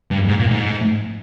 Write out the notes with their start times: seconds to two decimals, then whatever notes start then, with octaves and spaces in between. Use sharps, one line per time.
0.11 G2
0.28 G#2
0.40 A#2
0.51 G#2